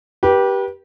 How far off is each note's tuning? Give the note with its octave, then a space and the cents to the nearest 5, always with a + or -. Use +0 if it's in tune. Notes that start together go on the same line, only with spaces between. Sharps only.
G4 -10 B4 -35